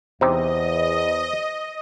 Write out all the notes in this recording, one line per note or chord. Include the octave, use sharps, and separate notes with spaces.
E2 C3 D#4 G4 C5 D#5